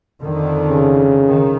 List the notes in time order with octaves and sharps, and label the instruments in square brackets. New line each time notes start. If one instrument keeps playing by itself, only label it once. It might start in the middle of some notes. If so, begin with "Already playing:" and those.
[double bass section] F2 D3 D#3
[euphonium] C#3
[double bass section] D#3